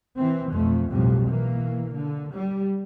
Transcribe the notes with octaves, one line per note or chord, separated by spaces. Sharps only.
E3 C4
B1 F2 A3
B1 F2 A2 G3
B2 E3 A#3
D3
G3